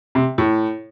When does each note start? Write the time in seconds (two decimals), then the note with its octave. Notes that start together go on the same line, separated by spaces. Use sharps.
0.15 C3
0.38 A2